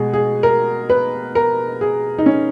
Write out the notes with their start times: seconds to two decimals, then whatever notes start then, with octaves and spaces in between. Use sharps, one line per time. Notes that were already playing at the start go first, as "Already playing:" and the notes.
Already playing: B2 G#3 G#4
0.13 G#4
0.43 A#4
0.90 B4
1.35 A#4
1.81 G#4
2.18 D#4
2.26 C#4